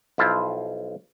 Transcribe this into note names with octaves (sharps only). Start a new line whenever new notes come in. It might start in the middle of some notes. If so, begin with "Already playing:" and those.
B1 F3 E4 F4 C5 A5